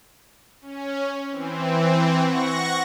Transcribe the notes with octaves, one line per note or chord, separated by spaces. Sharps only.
C#4
E3 C4
F#5 C#6 A#6